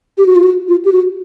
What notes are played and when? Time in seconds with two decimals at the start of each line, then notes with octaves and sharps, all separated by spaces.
0.18 G4
0.26 F#4
0.36 F4
0.43 F#4
0.68 F4
0.85 G4
0.92 F#4